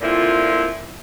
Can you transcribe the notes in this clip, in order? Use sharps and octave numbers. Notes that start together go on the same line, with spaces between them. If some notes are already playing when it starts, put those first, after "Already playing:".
A#2 D3 C4 E4 F4